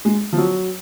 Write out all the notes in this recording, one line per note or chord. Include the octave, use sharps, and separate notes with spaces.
G#3
F3
F#3